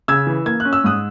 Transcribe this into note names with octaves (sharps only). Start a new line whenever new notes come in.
C#3 E6 G#6
E3
A#3 G#6
F#6
C#4
E6
G#2 D#6 F#6